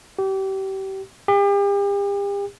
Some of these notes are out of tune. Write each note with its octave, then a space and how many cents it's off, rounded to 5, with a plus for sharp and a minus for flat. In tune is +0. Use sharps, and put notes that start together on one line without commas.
G4 -30
G4 +40